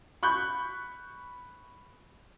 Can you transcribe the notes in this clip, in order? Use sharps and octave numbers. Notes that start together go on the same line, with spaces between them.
B5 C#6 F#6 G6